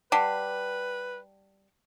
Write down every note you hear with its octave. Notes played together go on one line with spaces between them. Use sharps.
G3 B4 F#5 A5